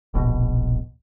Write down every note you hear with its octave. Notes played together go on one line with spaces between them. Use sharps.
D1 A#1 B2